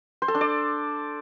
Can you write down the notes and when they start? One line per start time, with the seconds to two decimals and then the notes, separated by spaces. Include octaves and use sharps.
0.22 C5
0.28 A4
0.35 D4
0.41 D5